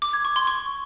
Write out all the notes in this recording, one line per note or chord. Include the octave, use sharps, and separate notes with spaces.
D6
G#6
C#6
C6
C#6